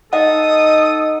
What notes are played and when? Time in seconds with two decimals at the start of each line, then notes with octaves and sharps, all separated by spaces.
0.13 D#4 A4 D#5 F#5 D#6